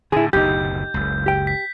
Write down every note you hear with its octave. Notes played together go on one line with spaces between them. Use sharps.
A2 D3 E4 G#4
F#1 D2 B2 D#4 G4 G6
F#1 C#2
G4 G5
B6